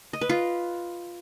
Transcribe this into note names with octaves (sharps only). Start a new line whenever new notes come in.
D#5
B4
F4